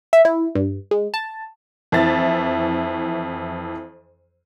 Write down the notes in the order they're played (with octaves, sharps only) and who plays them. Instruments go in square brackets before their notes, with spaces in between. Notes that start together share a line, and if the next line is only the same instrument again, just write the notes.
[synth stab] E5
E4
G2
G#3
A5
[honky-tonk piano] F2 E3 E5 A6